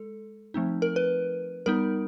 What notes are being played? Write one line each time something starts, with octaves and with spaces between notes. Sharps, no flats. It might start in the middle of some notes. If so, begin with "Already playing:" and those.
Already playing: G#3 A4
F3 A3 C4 D#4
A#4
B4
G3 B3 D#4 A#4